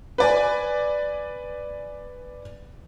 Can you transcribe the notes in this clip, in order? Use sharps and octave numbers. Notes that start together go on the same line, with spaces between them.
B4 D5 G#5